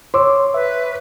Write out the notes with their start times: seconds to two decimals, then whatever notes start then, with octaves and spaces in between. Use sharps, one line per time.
0.14 C#5 C6 D6 E6
0.54 B4 E5